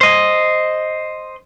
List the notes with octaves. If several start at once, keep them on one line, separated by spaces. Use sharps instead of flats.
C5 D#5